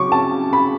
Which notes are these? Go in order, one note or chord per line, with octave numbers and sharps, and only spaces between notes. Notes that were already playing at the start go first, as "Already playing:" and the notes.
Already playing: C#3 F#3 C#4 C#6 D6
A5
B5